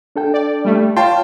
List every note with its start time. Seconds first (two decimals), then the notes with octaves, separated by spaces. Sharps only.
0.16 D4 A4 G5
0.34 D5
0.65 G3 A3
0.97 F4 C#5 F5 G5 A5 C6